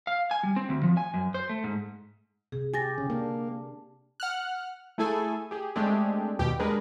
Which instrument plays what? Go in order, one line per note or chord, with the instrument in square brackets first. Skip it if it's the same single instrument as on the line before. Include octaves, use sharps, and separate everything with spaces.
[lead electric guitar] F5
G#5
G3
C4
D2
F3
G#5
F#2
C5
A3
G#2
[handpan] C3 [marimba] G#4
[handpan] G4 [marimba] G#5 A6 A#6
[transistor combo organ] C#3
[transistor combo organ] A#3 [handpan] D4
[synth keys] F#5 F6 F#6
A3 E4 G#4 A4 G#5
G4 G#4
G#3 A3 C4 D4 G4 G#4
D#2 B2 G4
G#3 D4 G#4 A#4 B4